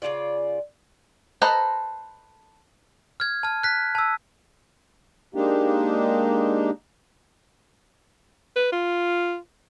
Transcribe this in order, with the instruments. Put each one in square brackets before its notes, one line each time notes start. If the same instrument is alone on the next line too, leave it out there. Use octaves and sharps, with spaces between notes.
[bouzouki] C#3 F#3 F4 D5
[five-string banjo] A4 B4 C5 D#5 A#5
[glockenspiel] F6 G#6
A5 F6
F#6 B6
A5 E6
[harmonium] G#3 A#3 D4 D#4 G4
[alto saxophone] B4
F4